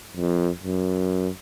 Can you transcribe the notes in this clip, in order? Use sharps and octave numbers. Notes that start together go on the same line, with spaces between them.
F2
F#2